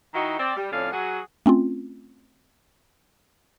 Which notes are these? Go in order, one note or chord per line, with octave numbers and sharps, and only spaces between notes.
D#3 D#4 E4 F#4
C4 D5
G3
F2 A2 C#4 D5 F5
F#3 F#4 G#4 F#5
A3 C4 C#4 F4